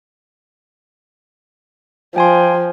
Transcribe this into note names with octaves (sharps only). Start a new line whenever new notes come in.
F3 G5 G#5 C6